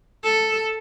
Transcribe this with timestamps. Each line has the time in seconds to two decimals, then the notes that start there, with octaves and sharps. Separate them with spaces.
0.24 A4